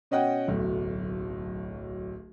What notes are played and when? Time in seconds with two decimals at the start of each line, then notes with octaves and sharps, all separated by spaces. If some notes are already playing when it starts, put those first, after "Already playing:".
0.11 B2 C#4 D#5 F#5 G5
0.48 D1 B1 A3